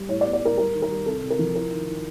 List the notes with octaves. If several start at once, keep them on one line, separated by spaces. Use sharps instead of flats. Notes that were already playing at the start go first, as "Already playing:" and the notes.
Already playing: G3
A2 C#5
D5
B3
D5
A2 A#4
G3 A#4
D#3
A#4
G3
C3 A4
C3
A#4
F3
E4 A#4
D#3
D#3